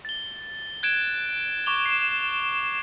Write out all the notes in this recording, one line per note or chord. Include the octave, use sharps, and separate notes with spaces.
A6 G7
F#6 G#6 D7 E7
C#6 D6 G7
C7 E7